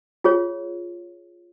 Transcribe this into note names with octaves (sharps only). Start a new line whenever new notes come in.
F4 G#4 C#5